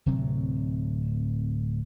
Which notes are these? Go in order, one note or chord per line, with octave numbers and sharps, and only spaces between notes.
D1 C3 F#3 C4